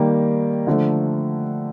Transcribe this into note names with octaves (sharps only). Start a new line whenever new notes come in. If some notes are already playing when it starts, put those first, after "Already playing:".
Already playing: D#3 G3 A#3
D3 F3 A3